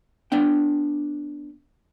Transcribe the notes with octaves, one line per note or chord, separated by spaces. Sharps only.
B3 D4 G5